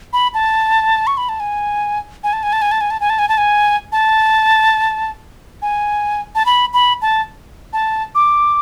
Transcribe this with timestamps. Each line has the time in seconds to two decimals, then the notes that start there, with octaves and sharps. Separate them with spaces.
0.13 B5
0.34 A5
1.07 C#6
1.17 B5
1.29 A5
1.40 G#5
2.24 G#5
2.33 A5
2.43 G#5
2.53 A5
2.62 G#5
2.72 A5
2.81 G#5
2.90 A5
3.00 G#5
3.10 A5
3.19 G#5
3.29 A5
3.38 G#5
3.92 A5
5.62 G#5
6.35 A5
6.46 B5
6.74 B5
7.02 A5
7.73 A5
8.15 D6